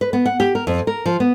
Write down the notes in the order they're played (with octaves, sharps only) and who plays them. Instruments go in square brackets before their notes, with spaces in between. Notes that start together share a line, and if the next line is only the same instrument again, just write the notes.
[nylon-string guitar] B4
B3
F#5
G4
A#4
F2
A#4
F3
B3